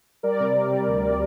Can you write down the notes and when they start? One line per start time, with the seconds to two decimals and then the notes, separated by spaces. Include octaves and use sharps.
0.23 G3 A#4 D5
0.40 C3
0.55 G3
0.72 G3
0.88 D2